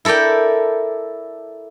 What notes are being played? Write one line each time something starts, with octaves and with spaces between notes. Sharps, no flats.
E4 A4 A#4 D5 G5